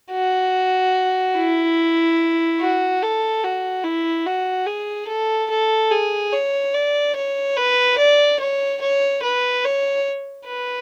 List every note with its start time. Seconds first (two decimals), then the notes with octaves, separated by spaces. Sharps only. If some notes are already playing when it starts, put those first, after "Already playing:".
0.12 F#4
1.36 E4
2.61 F#4
3.03 A4
3.44 F#4
3.84 E4
4.26 F#4
4.67 G#4
5.08 A4
5.50 A4
5.91 G#4
6.33 C#5
6.74 D5
7.16 C#5
7.57 B4
7.98 D5
8.40 C#5
8.81 C#5
9.23 B4
9.65 C#5
10.46 B4